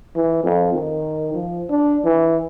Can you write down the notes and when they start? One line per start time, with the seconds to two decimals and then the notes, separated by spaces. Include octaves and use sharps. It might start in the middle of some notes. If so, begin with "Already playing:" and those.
0.15 E3
0.44 F2
0.74 D#3
1.34 F3
1.70 D4
2.04 E3